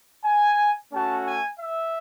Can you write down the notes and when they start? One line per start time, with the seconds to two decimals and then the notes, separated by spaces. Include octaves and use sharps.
0.25 G#5
0.92 A3 C#4 F#4 A5
1.25 G#5
1.59 E5